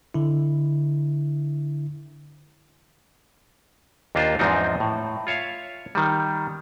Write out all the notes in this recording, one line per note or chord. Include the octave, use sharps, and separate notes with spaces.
D3 E4
D#2 A#3 D4 F4 C5
E2 G#2 F3 C4 D4 D#4
A2
F4 C#5 E5 F5
D#3 G3